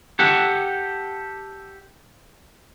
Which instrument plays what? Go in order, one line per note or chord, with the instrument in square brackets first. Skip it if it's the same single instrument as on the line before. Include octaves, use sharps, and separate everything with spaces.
[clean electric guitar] G4 A4 F#5